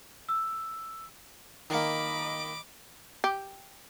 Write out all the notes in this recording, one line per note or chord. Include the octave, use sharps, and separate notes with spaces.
E6
D#3 A#3 D#5 B5 D6
G4